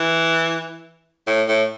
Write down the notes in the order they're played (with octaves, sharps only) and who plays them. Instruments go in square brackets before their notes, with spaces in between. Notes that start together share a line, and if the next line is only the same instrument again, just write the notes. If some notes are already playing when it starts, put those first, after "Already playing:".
Already playing: [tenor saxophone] E3
A2
A2